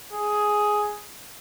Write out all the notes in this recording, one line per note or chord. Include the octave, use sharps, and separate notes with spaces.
G#4